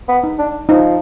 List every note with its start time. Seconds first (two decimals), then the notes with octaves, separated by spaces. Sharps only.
0.09 B3
0.24 D#4
0.39 D4
0.69 F3 D#4